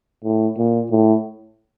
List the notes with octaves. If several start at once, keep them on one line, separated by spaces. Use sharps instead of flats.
A2
A#2
A2